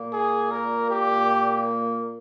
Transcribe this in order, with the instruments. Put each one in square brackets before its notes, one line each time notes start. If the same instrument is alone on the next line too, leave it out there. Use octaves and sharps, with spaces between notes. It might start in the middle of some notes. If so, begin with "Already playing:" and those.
Already playing: [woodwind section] A#2 A#3
[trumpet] G#4
A#4
G4